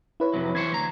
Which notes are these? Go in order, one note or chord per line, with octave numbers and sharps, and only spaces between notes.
E4 B4 C#5
F2 C3 F#3
E3 C5 C#5 G#6
D2 A#5